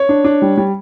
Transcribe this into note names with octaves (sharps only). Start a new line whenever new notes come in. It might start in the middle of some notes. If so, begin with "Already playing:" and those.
Already playing: C#5
D4
D4
G3
G3